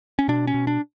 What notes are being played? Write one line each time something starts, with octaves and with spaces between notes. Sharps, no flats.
C#4
B2 D4
C#4
B2
D4